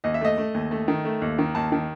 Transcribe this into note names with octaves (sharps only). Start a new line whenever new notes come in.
D#2 D#5
E5
A3 D#5
A3
D#2
A3
D#3
A3
D#2
D#3
D#2 A5
D#3